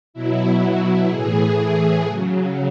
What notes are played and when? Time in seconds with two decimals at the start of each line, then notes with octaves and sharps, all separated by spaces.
0.14 B2 F#3 E4
1.09 A2 E3 G#4
2.04 C#3 F#3